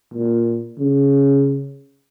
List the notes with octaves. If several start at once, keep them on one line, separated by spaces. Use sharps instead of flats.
A#2
C#3